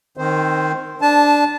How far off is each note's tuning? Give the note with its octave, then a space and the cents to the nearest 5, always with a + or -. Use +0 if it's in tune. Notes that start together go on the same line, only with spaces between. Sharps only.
D#3 -10 C4 +10 C5 -5
D4 +0 A5 -15